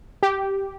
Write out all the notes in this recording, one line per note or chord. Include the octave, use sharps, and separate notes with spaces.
G4